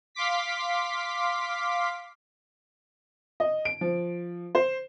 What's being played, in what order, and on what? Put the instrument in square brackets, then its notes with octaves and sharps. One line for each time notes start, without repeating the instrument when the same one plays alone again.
[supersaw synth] F5 C6 D6 B6
[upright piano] D#5
D7
F3
C5